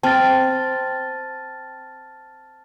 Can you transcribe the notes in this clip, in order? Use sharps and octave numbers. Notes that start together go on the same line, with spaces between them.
C4 A5 F6 A6